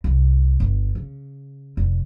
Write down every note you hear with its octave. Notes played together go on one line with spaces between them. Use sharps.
C2
G1
C#3
F1